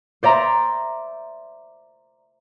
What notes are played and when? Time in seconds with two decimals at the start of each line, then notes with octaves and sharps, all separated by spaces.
0.23 C5 D5 E5 A#5 C6